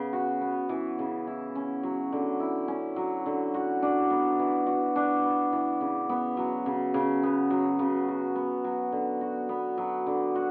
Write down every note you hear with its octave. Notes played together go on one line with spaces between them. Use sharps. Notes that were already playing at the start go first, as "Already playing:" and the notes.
Already playing: C#3 B3
F#4
B3
E3
C#3
E4
C#4
F#3
D3
E4
C#4
F#3
D3
F#4
D4
B3
E3
F#4
D4
B3
E3
C#3
B3
F#3
C#3
C#3
B3
F#3
C#3
F#4
B3
F#3
D3
F#4
B3
F#3
D3
F#4